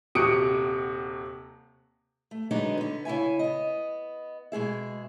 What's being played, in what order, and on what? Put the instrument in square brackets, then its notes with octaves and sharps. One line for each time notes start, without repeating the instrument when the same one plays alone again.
[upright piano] D#1 C3 F#4 D#6 C#7 D7
[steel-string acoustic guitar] A3
D3 F#3 G#3 B3 D4 D#4
D3 B3
C#3 E4 E5 G#5
B3 D#5
B2 G#3 G#4 E5